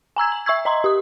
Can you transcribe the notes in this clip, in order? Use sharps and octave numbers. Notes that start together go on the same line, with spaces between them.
G#5 A#5 E6 G#6
F#7
E5 C#6 E6 G#6
D#5 A#5 C6
G4 D#6